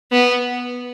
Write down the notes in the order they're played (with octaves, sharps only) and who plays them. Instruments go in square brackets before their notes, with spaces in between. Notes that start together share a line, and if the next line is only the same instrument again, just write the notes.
[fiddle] B3